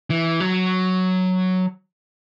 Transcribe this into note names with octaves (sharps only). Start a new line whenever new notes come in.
E3
F#3